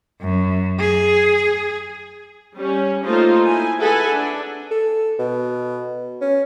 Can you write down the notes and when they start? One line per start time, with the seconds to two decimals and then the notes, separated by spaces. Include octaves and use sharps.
0.21 F#2
0.80 G#4
2.57 G3 C#4
3.06 A3 A#3 D#4 F4 A4 C5
3.47 E4 G#5
3.80 G#4 A4 B4 E5 F#5 G#5
4.12 D4
4.71 A4
5.19 B2
6.21 C#4